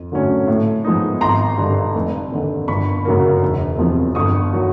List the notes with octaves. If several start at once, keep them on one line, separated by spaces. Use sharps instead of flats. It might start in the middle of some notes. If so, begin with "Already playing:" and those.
Already playing: F2
D3 F#3 A3 C#4
A2
F3 G#3 B3 D#4
G#1 A#5 C6
G2 D3
F1
D#2 D3
G1 B5 C#6
F#2 C#3 F#3 A#3
E1
E2 C3 F3
G1 C#6 D#6
D#3 F#3